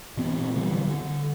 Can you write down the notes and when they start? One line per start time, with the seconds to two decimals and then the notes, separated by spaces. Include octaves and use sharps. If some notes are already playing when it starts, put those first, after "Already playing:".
0.17 A#2 E3 B3 C4
0.55 D3 E3 F#3 G3
0.87 D3